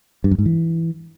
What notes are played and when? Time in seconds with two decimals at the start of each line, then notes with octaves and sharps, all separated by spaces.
0.24 G2
0.31 F#2
0.38 G#2
0.46 E3